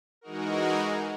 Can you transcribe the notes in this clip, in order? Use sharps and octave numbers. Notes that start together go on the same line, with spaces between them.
E3 G#3 D#4 F#4 A#4